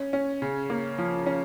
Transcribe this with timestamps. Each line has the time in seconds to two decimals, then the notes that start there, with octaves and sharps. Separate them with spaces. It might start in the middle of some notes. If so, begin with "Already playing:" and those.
Already playing: C#4
0.13 C#4
0.42 C#3
0.70 A#3
0.98 F3
1.26 C#4